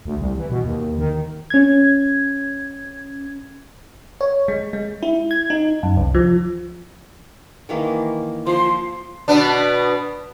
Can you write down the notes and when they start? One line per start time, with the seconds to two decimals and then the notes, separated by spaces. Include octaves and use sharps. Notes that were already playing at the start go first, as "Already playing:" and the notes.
0.05 D2
0.19 C2
0.38 E3
0.50 B2
0.64 D#2
0.98 D#3
1.50 C#4 G#6
4.21 C#5
4.48 G#3
4.73 G#3
5.03 E4
5.31 G#6
5.50 D#4
5.83 F#2
5.97 C2
6.15 F3
7.69 D#3 E3 A#3
8.47 F3 C6
9.28 B2 B3 D4